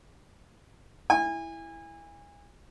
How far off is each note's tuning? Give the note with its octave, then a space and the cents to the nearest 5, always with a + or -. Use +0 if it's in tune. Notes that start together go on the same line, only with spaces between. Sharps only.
E4 +0 G#5 -30